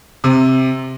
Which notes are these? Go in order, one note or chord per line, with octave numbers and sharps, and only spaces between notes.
C3